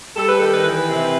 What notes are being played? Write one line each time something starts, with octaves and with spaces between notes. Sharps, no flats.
G3 A4
B4
D#3 A4
B4
E3 B4
C3